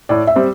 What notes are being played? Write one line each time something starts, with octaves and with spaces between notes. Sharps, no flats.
A2 D5
E5
G3 C4